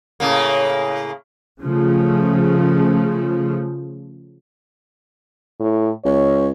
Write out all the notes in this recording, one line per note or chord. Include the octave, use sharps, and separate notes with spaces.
A2 C#3 A#3
C#3 F3 A3
A2
C#2 C#5